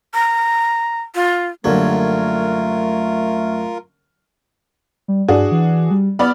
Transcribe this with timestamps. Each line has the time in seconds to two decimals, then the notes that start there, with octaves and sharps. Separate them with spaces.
0.14 A#5
1.15 F4
1.64 F#2 D3 G3 A3 A#3 C#4 F4 A#4
5.08 G3
5.28 G2 D4 F#4 G#4
5.52 E3
5.91 G3
6.19 B3 D5 B5 F6